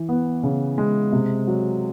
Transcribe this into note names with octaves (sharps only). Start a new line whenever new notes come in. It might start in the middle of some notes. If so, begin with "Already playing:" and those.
Already playing: E3
B3
C#3
G#3
C3
F#3